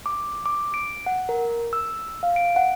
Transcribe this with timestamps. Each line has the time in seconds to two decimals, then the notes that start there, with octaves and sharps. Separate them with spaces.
0.06 D6
0.46 D6
0.74 D7
1.06 F#5
1.29 A#4
1.73 E6
2.23 F5
2.36 D7
2.56 F#5